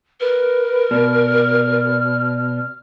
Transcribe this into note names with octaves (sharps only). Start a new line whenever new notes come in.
A#4 B4
B2 D5 F6